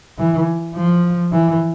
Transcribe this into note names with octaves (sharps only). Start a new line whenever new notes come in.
E3
F3
E3